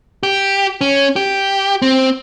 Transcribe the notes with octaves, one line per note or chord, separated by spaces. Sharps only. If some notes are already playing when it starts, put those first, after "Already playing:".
G4
C#4
G4
C4